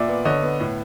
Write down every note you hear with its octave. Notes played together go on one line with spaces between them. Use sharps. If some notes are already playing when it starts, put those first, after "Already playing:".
Already playing: A#2 D5 E5
B3
D3 C#5 D#5
B3
A2